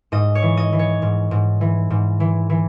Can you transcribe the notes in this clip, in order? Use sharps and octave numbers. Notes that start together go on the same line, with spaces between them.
G#2 D#5
C#5
E3
D#5
E3
C#5
G#2
G#2
E3
G#2
E3
E3